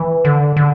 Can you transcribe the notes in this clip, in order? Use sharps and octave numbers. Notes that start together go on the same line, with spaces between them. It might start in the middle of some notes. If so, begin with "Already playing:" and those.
Already playing: E3
D3
D3